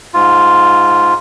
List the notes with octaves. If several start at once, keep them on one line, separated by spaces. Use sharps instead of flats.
G#2 F4